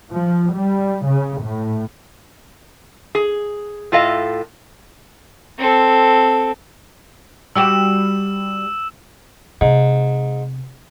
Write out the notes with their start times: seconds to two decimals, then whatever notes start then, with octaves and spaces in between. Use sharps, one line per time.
0.12 F3
0.54 G3
1.06 C#3
1.41 A2
3.15 G#4
3.92 A2 F4 A4 D#5 F5
5.58 C4 A4
7.55 G3 F#4 G4 E6 E7
9.61 G#2 C3